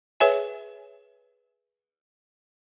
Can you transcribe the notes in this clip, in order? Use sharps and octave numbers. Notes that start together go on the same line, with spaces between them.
G#4 B4 C#5 E5 G#5